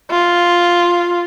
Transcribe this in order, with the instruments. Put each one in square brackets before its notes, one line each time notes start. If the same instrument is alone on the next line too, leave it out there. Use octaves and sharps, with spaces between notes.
[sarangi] F4